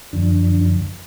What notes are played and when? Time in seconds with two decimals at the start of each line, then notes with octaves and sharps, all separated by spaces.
0.13 F#2 D3 F3 D4